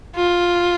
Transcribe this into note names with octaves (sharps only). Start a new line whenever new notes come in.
F4